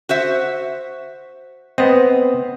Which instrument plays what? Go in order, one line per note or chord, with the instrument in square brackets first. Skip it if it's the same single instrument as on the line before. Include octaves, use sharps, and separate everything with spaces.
[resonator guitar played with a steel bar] F#4 C5 E5
[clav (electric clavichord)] B3 C4 [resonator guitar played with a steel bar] D#5